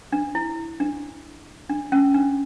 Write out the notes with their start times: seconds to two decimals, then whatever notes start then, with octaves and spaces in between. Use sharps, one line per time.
0.13 D4
0.35 E4
0.80 D4
1.70 D4
1.92 C#4
2.14 D4